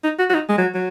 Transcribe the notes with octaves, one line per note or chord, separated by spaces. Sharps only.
D#4
F#4
F#4
D#4
G#3
F#3
F#3